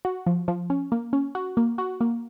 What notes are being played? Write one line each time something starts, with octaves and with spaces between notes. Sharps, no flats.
F#4
F3
F3
C#4
A#3
C#4
F#4
A#3
F#4
A#3